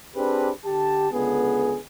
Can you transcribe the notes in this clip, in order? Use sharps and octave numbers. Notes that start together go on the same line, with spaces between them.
C4 D4 G4 G#4 B4
D3 G4 A5
C#2 D3 B3 G#4